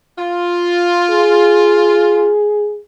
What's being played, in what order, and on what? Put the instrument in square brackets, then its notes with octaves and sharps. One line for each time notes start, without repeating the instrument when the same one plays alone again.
[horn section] F4
[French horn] G#4